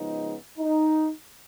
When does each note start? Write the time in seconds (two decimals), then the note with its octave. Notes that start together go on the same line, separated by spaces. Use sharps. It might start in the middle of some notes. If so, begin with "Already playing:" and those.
Already playing: C#3 F3 G#3 B3 D#4
0.58 D#4